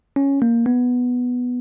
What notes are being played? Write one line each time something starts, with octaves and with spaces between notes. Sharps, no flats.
C#4
A#3
B3